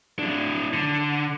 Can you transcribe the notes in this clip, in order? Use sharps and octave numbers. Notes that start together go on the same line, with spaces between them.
D4 E4
D3